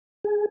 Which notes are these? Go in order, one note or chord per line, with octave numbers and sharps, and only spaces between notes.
G#4